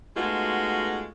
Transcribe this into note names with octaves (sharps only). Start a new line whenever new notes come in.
G#3 A3 B3 D#4 F4 F#4